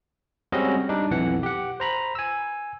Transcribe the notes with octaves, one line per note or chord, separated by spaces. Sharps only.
G3 G#3 C4 C#4 F#4 D#5
G3 D4 D#4
B1 F2 E3 F#5
G4 F#5
C5 A#5 B5
G#5 E6